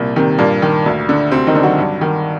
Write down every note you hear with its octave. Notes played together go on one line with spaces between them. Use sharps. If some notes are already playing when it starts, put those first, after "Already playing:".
Already playing: C2 A#2 A#3
C3 D#3
G2 A#2 A#3
D#3
D2
D3
D2 C3 C4
D#3 D#4
D3
F#3 F#4
G2
D#3